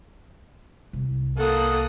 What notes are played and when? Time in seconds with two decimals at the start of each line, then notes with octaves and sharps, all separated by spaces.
0.93 C2
1.37 A#3 A4 F#5 D#6